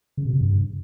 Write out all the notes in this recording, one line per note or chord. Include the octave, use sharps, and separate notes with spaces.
C#3
B2
C3
G2